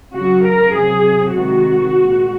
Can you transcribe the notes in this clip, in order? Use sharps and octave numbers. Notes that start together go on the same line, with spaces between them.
C#3 F#3 F#4
A#4
C3 F#3 G#4
C3 D#3 G#3 F#4
A#2 G#3